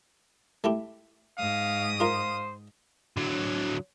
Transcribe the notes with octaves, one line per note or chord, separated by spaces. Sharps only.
A3 E4 G4
G#2 F5 D#6
F4 A#4 C5 F5
D3 F#3